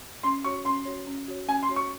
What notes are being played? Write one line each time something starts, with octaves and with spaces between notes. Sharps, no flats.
C#4 C6
F#4 C#5 C#6
C#4 C6
F#4 C#5
C#4
F#4 C#5
C#4 G#5
C6
F#4 C#5
C#6